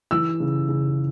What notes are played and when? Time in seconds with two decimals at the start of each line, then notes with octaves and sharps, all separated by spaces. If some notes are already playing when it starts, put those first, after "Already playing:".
0.11 E3 E6
0.40 C#3
0.68 C#3